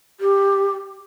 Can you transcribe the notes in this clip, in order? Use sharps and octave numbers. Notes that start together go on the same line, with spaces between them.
G4